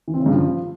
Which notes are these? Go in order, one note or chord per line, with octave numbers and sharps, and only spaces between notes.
E3
C4
C#3
G2
F3